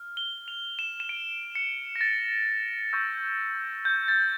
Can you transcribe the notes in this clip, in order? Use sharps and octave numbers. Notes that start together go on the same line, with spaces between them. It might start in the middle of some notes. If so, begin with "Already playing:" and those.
Already playing: F6
G7
F7
E7
E7
D7
C#7
A#6
A6
C#6 E6 G6
G6
A6